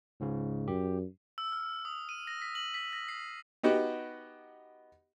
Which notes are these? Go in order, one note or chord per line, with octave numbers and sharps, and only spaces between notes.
C#2 G#2 C#3
F#2 G4
E6
F6
D#6
D#7
A#6
B6
F#7
B6
A#6
C7
B3 D#4 F#4 G4